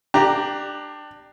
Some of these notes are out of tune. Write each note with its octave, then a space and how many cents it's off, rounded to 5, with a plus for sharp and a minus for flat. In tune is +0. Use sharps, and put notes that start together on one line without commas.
D4 +20 G4 -5 A#5 +0